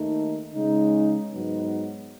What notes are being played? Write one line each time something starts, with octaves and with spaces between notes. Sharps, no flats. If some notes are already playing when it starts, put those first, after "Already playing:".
Already playing: D#2 D#3 A3 D#4
C#3 G#3 D#4
G#2 F#3 B3 D#4